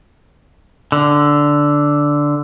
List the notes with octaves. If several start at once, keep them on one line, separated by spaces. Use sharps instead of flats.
D3